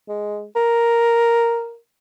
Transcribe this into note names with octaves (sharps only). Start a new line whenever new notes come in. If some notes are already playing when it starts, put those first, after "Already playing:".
G#3
A#4